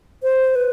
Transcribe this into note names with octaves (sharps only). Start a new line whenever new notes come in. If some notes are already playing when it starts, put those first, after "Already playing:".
C5
B4